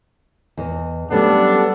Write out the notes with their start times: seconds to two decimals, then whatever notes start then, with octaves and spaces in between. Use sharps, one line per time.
0.57 E2 D#5
1.11 F#3 G3 A3 B3 C#4 D4 A4